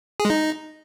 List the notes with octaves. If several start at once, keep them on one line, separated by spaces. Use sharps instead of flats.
G#4
G#3
D#4